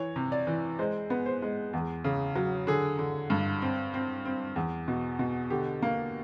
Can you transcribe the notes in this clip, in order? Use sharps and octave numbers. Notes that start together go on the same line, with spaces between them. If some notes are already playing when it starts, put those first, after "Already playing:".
Already playing: E3 C#5
C3
D5
E3
G#3 C5
B3
C5
G#3
E2
C#3
F#3
D3 G#4
D3
G2
C4
C4
C4
E2
B2
B2
D3 G4
A#3